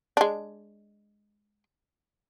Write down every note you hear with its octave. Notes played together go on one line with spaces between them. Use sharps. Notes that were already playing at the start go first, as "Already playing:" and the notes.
G#3 D4